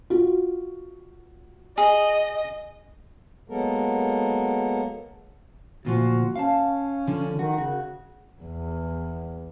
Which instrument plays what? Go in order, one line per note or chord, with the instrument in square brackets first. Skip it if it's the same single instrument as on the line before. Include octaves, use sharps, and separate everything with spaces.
[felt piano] F4 F#4
[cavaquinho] G#4 [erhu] D#5
[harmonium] F#3 G#3 A#3 B3 A4 A#4
[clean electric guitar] D2 A#2 F3 [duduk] F#4
[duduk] C#4 [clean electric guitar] F5 A5
[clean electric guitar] D3 F3
[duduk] D#3 [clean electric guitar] F#4
[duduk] C#3 [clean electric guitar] F#4
[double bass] E2